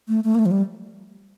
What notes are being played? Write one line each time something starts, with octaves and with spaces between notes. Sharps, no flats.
A3
A3
A#3
A3
F3
G3